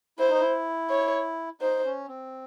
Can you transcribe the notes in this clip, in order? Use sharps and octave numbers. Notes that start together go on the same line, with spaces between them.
E4 C5
D#4
E4
C#5
D#4 C5
C#4
C4